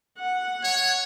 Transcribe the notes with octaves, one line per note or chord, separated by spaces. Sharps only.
F#5
C#5